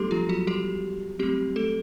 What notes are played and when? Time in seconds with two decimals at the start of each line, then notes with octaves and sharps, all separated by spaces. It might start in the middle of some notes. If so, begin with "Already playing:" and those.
Already playing: F#3 G3 A3 B3 D4 G4 A4
0.11 F3 F4
0.29 F#3 F#4
0.47 G3 G4
1.19 F#3 G3 A3 C4 G4
1.56 A3 A4